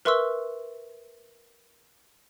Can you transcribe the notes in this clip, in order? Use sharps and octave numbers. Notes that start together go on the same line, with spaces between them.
A#4 B4 E5 C6 C#6 E6